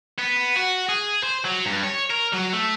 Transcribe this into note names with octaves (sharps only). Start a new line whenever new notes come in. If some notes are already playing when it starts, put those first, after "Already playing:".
B3
F#4
G#4
C5
F#3
G2
C#5
A#4
F#3
A3